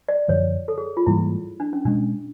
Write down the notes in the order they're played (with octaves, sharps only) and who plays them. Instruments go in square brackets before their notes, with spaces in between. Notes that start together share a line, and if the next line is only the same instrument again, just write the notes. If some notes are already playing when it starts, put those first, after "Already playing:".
[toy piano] D5
[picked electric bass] F#2 D3 F3 [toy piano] C#5
[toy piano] A4
G#4
F4
[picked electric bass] G#2 E3 G3 A#3 [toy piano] E4
[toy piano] D4
C#4
[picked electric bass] B2 G#3 C#4 [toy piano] D4